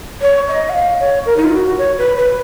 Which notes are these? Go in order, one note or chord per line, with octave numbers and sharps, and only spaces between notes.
C#5
D#5
F#5
F5
C#5
A#4
D#4
F4
F#4
C#5
B4
B4